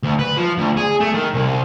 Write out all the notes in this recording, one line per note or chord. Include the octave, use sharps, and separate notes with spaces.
D2
B4
F3
D2
G#4
A3
D#3
C2